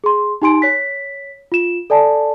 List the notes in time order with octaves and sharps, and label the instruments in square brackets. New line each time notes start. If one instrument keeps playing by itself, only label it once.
[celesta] G#4 C6
D#4 G4 G#5 C6 D7
C#5 B6
F4 E7
A4 D5 G#5 A5